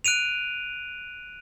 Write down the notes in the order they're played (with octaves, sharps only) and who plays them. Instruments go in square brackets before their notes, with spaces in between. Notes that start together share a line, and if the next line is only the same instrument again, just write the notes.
[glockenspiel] F#6 D7 D#7 F7